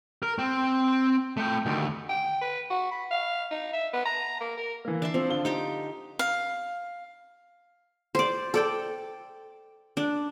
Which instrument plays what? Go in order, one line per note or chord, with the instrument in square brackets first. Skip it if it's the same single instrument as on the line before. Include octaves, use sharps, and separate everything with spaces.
[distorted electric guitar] A#4
C4
A3 G5
D2 D#3
[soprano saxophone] G5
B4
F#4
B5
F5
D#4
E5
B3
A#5
A#3
A#4
[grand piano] E3 A#3
[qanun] D4 E5 C6
[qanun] F3 [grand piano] C4
[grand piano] D3 F4 G7
[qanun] D#4 G4 G5
[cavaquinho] F5
[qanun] C5 D5
A4 D5 G5
D4